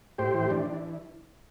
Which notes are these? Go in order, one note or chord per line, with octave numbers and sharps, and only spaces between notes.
A2 G4 C5
E3
E3 D4
E3